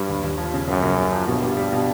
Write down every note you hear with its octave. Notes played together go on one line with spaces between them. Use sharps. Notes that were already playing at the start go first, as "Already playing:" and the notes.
Already playing: G2 G3
D#2
D#2
F3
C#3
F#2 C#3
C#3
C#3
F3
G2 B2
G3
G3
B2